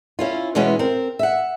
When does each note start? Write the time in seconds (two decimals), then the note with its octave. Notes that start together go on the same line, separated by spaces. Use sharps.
0.19 C#4 E4 F4
0.55 B2 E3 G#3 B3 C#4 E4
0.79 C4 A#4
1.19 E5 F#5